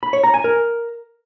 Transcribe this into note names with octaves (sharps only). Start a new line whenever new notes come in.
B5
C#5
A#5
G#5
A#4